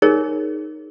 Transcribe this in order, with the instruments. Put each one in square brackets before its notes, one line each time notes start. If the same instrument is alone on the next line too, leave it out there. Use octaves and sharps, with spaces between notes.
[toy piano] D#4 G#4 A#4 C#5